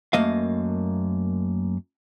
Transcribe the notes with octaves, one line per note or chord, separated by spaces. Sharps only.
F#2 A3 A#3 D#5 F5